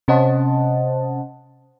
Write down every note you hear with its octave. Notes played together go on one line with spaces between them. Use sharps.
C3 C#4 C5 D#5 F#5 A5